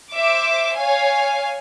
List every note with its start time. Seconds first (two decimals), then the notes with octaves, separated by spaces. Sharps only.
0.12 C5 E5 D6
0.77 C#5 F5 G#5